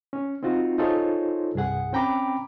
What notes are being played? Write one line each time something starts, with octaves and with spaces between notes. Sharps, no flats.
C#4
C4 D#4 F4 F#4
D#4 F4 G#4 A4 C5 C#5
C2 G2 G#4 F#5
C4 C#4 G5 A#5 B5 D6